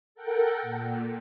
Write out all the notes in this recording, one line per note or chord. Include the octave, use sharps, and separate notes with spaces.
A4 A#4 F#5 G5
A#2